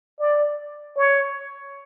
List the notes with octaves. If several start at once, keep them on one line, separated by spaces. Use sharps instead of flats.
D5
C#5